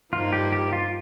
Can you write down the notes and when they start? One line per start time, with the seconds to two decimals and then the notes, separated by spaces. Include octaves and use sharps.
0.12 G2 F3 A#3 D#4 F4
0.33 G4
0.52 G4
0.73 F4